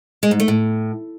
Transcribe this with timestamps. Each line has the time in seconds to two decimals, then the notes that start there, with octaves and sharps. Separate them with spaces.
0.23 G#3
0.31 G#2
0.40 A3
0.48 A2